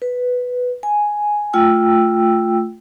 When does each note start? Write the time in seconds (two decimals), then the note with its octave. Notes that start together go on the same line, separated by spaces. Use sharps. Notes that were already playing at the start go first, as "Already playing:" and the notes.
0.02 B4
0.83 G#5
1.53 A3 F4 G5 E6